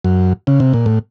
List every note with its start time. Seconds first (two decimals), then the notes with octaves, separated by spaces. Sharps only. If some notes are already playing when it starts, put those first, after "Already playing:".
0.05 F#2
0.47 C#3
0.60 C3
0.74 A#2
0.86 A2